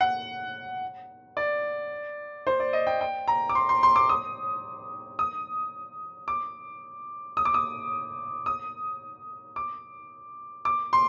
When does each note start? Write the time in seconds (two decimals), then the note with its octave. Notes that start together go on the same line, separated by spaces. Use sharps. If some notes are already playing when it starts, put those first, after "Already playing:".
0.01 F#5
1.37 D5
2.47 C5
2.60 D5
2.73 D#5
2.87 G5
3.01 G5
3.28 A#5
3.49 D6
3.55 C6
3.69 C6
3.83 C6
3.96 D6
4.09 D#6
5.19 D#6
6.28 D6
7.37 D#6
7.45 D6
7.54 D#6
8.46 D#6
9.56 D6
10.65 D6
10.93 C6